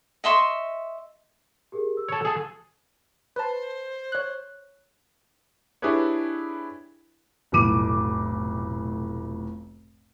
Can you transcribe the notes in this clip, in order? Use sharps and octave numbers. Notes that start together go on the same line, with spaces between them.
D#5 E5 C6 C#6
G4 G#4 A#4
E6
A4 C#5
G#4 A4
B4 C5 A5
C#5 F#6
D4 E4 G4 G#4 B4 C#5
F1 B1 A2 D6 D#7